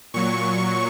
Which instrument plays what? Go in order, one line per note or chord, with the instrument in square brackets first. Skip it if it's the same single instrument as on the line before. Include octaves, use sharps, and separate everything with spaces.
[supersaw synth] A#2 F#3 C#6